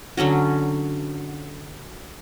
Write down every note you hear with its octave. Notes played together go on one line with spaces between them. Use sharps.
D3 F#3 C#4 F#4